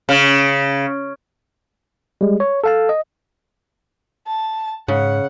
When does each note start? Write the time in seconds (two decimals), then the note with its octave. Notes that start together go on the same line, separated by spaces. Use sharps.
0.09 C#3
2.21 G3 G#3
2.40 C#5
2.64 A4 F5 A5
2.89 D#5
4.26 A5
4.88 G#2 C#3 F#5